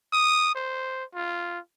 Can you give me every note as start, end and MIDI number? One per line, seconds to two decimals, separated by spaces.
0.13 0.54 87
0.55 1.04 72
1.15 1.59 65